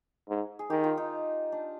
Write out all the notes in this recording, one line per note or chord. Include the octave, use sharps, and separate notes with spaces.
G#2
G#4
D#3 G4
F4
D#4
D4